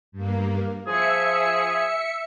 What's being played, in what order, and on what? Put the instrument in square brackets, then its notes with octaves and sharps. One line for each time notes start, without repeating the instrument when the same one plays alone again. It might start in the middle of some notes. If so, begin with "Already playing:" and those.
[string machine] G2 A#3
[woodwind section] F3 G#4 [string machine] E5 C#7